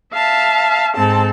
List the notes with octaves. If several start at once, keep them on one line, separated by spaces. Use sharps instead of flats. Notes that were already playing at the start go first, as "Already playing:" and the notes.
E5 F5 A5
G#2 C4 A4 A5